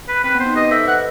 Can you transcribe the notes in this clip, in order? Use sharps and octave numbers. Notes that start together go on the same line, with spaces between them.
B4
C4 B4
B3
C5
D#4
G4 B4 D#5
A4 C5 E5
B4 D#5 F#5